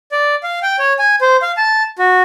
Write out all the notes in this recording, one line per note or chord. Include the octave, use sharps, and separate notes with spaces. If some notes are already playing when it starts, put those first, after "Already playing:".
D5
F5
G5
C#5
G#5
C5
F5
A5
F#4